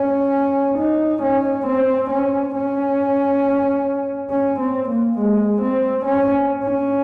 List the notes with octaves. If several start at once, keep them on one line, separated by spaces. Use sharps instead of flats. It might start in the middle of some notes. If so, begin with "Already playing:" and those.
Already playing: C#4
D#4
C#4
C4
C#4
C#4
C#4
C4
A#3
G#3
C4
C#4
C#4